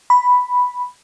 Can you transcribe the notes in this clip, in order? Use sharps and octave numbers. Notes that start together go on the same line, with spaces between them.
B5